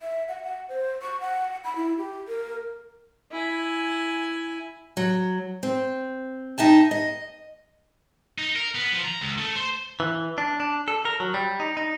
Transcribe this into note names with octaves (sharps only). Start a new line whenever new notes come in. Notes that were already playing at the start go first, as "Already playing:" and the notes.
E5
F#5
F#5
C5
C#6
F#5
B5
E4
G4
A#4
E4 G#5
F#3
C4
D#4 E5 G5 A5
D#5
D#4
A#4
B3
F3
A#5
C#2
A3
C5
E3
D4
D4
A4
A#4
F#3
G3
D#4
D#4